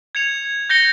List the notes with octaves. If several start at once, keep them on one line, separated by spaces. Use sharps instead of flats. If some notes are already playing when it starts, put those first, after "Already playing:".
G#6 C#7 F7
G6 A#6 C#7 G7